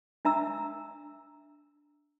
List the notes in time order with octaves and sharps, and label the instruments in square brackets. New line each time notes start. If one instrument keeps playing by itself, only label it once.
[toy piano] D4 E5 A#5 E6